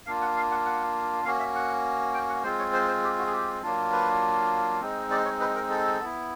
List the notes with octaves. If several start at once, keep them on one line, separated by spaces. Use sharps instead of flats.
A#3 D4 F4 F5
F#5
F5
F#5
F#5
A#3 C#4 F#4 F5
E5
F#5
G5
F#5
G#3 C4 F4 C5
C#5
C5
C5
G4
F#4
G#4
G4
F#3 A#3 D4 F4
B4
G#3 C4 D#4
D5
C#5
B4
A#4
A4
B3 E4